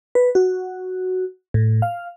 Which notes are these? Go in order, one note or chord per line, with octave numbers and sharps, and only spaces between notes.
B4
F#4
A2
F5